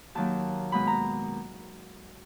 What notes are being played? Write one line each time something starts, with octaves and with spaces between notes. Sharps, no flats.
D#2 D#3 F#3 A#3 A5
B2 G#3 B3 B5
A#5